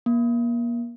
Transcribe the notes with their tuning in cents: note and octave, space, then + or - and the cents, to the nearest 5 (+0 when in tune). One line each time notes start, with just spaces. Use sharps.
A#3 +30